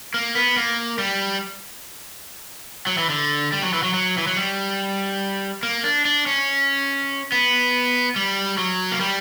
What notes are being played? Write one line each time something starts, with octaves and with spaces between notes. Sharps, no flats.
A#3
B3
A#3
G3
F#3
E3
D3
G3
F#3
E3
F#3
F#3
E3
F#3
G3
A#3
D4
D4
C#4
B3
G3
F#3
A#3
G3